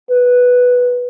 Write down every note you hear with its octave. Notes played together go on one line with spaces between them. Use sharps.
B4